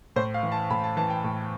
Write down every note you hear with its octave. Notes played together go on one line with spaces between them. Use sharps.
A2 C5
F5
E3
A5
A2 B5
A5
E3 A5
G5
A2